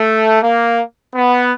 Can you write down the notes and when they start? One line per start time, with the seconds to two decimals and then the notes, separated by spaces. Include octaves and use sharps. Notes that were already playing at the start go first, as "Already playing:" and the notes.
Already playing: A3
0.41 A#3
1.14 B3